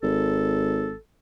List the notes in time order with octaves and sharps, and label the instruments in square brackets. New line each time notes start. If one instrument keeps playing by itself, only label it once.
[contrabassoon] G#1 [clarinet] A4